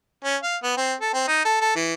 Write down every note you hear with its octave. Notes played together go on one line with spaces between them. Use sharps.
C#4
F5
B3
C4
A4
C4
D#4
A4
A4
E3